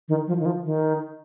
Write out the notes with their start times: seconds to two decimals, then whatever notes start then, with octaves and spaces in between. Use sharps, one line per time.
0.08 D#3
0.27 F3
0.39 D#3
0.46 F3
0.65 D#3